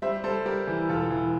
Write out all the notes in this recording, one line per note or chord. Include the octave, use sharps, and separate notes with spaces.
G3 C5 E5
G3 A4 C5
G3 G4 A#4
E3
E1 F4 A4
E3